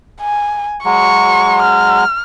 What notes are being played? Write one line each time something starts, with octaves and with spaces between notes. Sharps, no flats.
G#5
F#3 G#3 C#6
F6